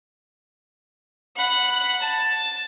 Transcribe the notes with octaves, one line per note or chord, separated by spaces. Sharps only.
F#5 B5
A5